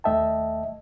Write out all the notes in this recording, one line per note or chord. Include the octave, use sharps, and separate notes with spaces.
D#2 A3 D#5 E5 G5 A5